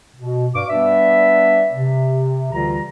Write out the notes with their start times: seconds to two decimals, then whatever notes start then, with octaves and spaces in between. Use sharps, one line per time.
0.16 B2
0.55 G2 D5 F5 C#6 D6
0.69 G3 B3 D4 B4 D5 E5
1.72 C3
2.52 D2 D3 E3 G3 F4 A#5